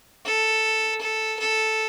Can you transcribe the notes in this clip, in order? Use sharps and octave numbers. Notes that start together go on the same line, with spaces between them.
A4
A4
A4